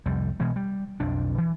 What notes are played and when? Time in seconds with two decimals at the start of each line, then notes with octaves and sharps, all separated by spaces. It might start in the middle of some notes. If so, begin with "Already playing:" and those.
0.06 C2 F2 G3
0.40 B2 E3 G#3
0.56 G3
1.00 B1 F2 F3 D4
1.38 E3